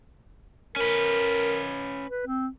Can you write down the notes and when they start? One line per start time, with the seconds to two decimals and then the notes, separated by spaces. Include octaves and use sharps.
0.76 C#4 A#4 B4
2.09 B4
2.27 C4